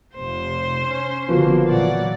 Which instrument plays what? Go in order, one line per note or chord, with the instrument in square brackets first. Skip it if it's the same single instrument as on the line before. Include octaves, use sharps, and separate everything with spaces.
[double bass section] F1 [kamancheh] C5
[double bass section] C#4
[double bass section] F#1 D3 A#3 [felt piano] F3 B3 F#4
[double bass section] A#2 E3 F#3 [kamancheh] D5 F#5